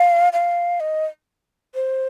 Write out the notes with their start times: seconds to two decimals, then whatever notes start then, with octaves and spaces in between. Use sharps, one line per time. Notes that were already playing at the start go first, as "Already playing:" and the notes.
Already playing: F5
0.33 F5
0.80 D#5
1.75 C5